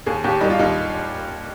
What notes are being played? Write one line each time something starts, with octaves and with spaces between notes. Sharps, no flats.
D#2 G#4
D#2 G4
G3 D#4
F4
D#2 D#4